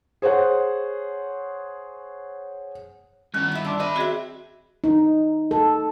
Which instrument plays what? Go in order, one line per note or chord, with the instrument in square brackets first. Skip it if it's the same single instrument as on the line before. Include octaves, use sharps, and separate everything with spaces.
[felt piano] G#4 C5 C#5 F#5
[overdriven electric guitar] G2 B3 [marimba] D#3 [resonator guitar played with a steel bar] C#4
[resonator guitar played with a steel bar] E4 E5
[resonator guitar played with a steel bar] D4 [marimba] C6 D6 E6
[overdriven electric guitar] C5 B5 [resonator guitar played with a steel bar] D#5 E5
[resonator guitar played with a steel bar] C4 E5 [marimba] F#4 G#4
[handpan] D#4
A4